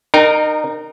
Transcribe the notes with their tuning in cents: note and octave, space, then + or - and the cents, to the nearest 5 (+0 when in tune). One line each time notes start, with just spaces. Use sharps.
D#4 -30 A#4 +0 G5 +0